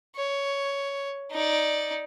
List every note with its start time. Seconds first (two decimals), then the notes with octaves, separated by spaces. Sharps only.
0.16 C#5
1.31 D#4 D5